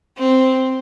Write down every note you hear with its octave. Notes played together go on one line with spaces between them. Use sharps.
C4